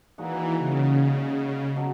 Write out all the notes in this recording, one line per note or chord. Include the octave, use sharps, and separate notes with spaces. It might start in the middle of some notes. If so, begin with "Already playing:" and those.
A#2 E3 G#3 D#4 F#4
C#3
B2 F#3 B3